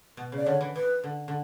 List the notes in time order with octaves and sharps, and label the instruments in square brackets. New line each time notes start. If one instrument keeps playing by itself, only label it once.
[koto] B2
C#3
[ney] D5
[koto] D3 [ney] C#5
[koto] E3
[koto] E3 [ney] B4
[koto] D3
D3